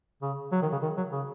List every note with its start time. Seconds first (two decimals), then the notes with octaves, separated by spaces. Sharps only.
0.22 C#3
0.52 F#3
0.62 D#3
0.72 C#3
0.82 D#3
0.97 F#3
1.12 C#3